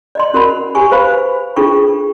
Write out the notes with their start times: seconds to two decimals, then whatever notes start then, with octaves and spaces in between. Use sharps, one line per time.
0.15 D5 D#5 C6
0.34 C#4 F#4 A#4 F#5 B5
0.75 G4 G#5 C#6
0.91 B4 C5 F5 B5
1.56 D4 F4 G#4 A4 G5 C#6